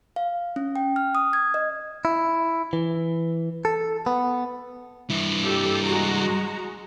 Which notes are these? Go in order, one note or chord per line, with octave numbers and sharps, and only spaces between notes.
F5
C#4
G5
F6
D#6
G#6
D#5
E4
E3
A4
B3
G2 E4
G4 A4
G#3 F#4 A#5